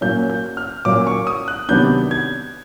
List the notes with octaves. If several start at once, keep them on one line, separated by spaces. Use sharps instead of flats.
A#2 F#3 A#3 C#4 G6
G6
F6
A#2 F#3 A#3 C#4 D6
C#6
D#6
F#6
C3 D#3 F#3 B3 D4 G6
G#6